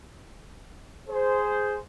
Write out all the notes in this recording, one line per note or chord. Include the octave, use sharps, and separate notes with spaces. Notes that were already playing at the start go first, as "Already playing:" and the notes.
G#4 C5